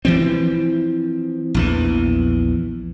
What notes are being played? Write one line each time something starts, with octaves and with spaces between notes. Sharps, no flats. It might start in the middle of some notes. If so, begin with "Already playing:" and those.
E3 F3 C4
A#1 E2 E3